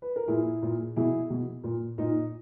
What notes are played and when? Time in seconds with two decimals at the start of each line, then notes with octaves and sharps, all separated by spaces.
0.02 B4
0.16 A#4
0.28 A#2 E4 G#4
0.62 A#2
0.96 B2 E4 G#4
1.30 B2
1.64 A#2
1.98 A#2 D#4